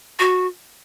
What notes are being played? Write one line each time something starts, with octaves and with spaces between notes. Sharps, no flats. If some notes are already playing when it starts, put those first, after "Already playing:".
F#4